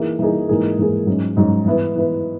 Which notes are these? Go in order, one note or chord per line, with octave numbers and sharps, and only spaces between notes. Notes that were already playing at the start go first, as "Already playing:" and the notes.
Already playing: E3 A#3 D#4 G#4
E3 A#3 D#4 G#4
G#2 E3 A#3 D#4 G#4
G#2 E3 A#3 D#4 G#4
G#2 F#3 C#4
G#2 F#3 C#4
E3 B3 E4 B4
E3 B3 E4 B4